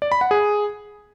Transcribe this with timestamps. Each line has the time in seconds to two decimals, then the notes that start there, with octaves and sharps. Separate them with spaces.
0.02 D5
0.12 B5
0.21 F#5
0.31 G#4